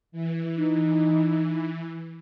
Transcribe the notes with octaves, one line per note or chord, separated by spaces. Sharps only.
E3
D#4